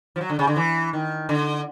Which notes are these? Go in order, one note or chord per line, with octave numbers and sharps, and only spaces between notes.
F3
F#3
D3
C#3
D3
E3
D#3
D3